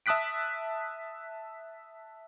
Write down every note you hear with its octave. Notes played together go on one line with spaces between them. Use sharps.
E5 A5 D#6 F#6 B6 D7